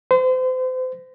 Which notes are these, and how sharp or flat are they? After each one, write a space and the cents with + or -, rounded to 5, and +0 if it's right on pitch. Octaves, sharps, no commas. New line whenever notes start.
C5 -35